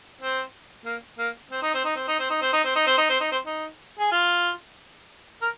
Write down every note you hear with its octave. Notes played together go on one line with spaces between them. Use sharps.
C4
A#3
A#3
C4
D#4
C4
D#4
C4
D#4
C4
D#4
C4
D#4
C4
D#4
C4
D#4
C4
D#4
C4
D#4
G#4
F4
A#4